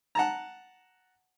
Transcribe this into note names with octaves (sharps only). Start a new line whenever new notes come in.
F#5 A5 A#5